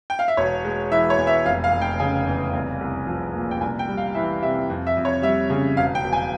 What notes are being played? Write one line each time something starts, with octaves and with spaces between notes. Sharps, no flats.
G5
F5
E5
E1 C#5
G#3
E3 E5
C#5
E2
E5
F1 F5
F5
F1
G5
C#3 G#5
E2
C2
C2
F3
A#2
G5
C2 G#5
G5
G3
F5
E3 E5
C3 E5
F2
E5
F2
C#5
G3 E5
C#3
E1 F5
G5
E1
G#5